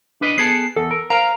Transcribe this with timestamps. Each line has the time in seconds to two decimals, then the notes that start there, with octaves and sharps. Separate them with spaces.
0.21 D4 B4 D#5
0.38 B3 G#4 A4 C7
0.76 E2 A4
0.91 A#4
1.10 A#4 C5 F5 A#5